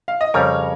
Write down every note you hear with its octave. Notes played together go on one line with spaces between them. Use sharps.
F5
D#5
F2 C#3 G3 A#4 C#5